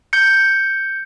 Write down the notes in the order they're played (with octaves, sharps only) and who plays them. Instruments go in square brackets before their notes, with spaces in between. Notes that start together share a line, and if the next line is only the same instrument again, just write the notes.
[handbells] G6 C#7